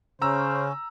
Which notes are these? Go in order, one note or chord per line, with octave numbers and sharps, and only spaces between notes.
C#3 C#4 C5 A#5 E6